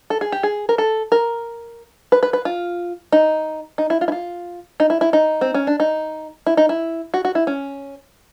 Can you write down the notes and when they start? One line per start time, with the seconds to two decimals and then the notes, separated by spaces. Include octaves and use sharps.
0.10 A4
0.21 G#4
0.32 G4
0.43 G#4
0.69 A#4
0.78 A4
1.12 A#4
2.12 B4
2.23 B4
2.33 B4
2.45 F4
3.12 D#4
3.78 D#4
3.90 E4
4.01 F4
4.08 E4
4.12 F4
4.80 D#4
4.90 E4
5.01 E4
5.13 D#4
5.41 C4
5.54 C#4
5.67 D4
5.80 D#4
6.47 E4
6.57 D#4
6.69 E4
7.14 F#4
7.25 F#4
7.35 E4
7.47 C#4